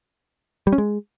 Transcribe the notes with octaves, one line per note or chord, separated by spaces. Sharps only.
G3
C#4
G#3